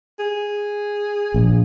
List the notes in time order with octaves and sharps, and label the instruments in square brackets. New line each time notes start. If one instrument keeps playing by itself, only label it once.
[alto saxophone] G#4
[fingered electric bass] A#1